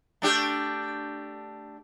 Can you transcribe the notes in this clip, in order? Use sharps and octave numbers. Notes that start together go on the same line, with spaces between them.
A3 D4 G4